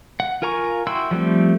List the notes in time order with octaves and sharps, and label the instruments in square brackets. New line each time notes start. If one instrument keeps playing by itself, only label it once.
[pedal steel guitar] F#5
F4 A#4 G#5 A#5 C#6
E4 F#4 G5 C6 E6
F3 G3 A3 C4